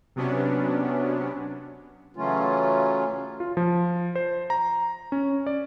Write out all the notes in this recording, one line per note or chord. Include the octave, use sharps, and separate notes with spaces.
C3 F#3 B3 C#4 D4
C#3 E3 F#3 A3 C#4 F4
F4
F3
C5
A#5
C#4
D5